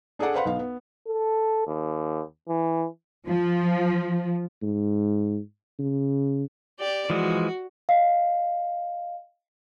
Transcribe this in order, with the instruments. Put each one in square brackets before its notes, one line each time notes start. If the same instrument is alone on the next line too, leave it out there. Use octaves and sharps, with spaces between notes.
[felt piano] D4 G#4 A4 D5 F#5
B4 C5 F5 F#5 B5 C6
B1 B3 F5
B3
[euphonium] A4
D#2
E3
[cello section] F3
[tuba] G#2
C#3
[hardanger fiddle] G4 D5
[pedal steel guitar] E3 F3 G#3 [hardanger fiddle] F#4
[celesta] D#5 F5